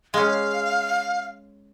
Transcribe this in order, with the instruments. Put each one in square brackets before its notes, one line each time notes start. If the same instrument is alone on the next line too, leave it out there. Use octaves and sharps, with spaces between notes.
[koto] G#3 C#4 [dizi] F5